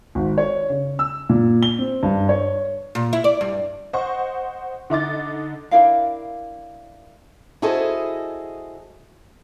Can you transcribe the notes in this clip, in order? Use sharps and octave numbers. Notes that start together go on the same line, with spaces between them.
G#1
C#5
C#3
E6
A#2
G7
C4
G2
C#5
A#2
E4
D5
G2
C5 D#5 F#5 C#6
D3 D#4 D6 A6
D4 E4 A#4 F5
E4 F#4 G#4 A4 C5 D#5